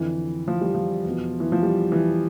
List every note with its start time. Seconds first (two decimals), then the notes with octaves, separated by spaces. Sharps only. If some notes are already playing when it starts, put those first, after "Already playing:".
Already playing: F2 D3 E3
0.48 F3
0.61 G3
0.74 F3
1.05 E2 B2
1.40 E3
1.52 F3
1.63 G3
1.92 E3